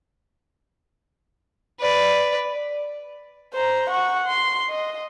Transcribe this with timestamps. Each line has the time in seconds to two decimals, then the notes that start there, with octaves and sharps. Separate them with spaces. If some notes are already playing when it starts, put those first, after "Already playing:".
1.80 B4 D5
3.54 C5 A#5
3.90 F#5 C#6
4.26 C6
4.69 D#5